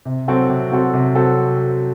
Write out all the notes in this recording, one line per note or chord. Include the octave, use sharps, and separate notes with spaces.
C3
F#3 C4 F#4 A4
C3
F#3 C4 F#4 A4
C3
F#3 C4 F#4 A4